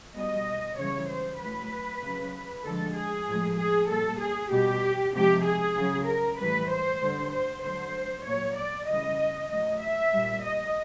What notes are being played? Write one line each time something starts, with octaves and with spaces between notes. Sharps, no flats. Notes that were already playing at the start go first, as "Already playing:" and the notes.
B2 G3 D#5
C#3 E3 G3 C#5
C5
A2 F#3 B4
C#3 F#3
D3 F3 G#3 A4
G#4
A2 F3 G#3
G#4
A#2 G3 A4
G#4
B2 G3 G4
C3 F3 G#3 G4
G#4
C#3 F#3
A#4
A2 E3 G3 B4
C5
D3 G3
C5
D3 F#3 C5
A#2 F#3 C#5
D5
C#3 E3 G3 D#5
A2 F#3 D#5
E5
A#2 G3
D#5